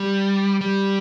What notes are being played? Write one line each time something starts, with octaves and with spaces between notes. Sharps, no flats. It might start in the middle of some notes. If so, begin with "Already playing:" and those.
Already playing: G3
G3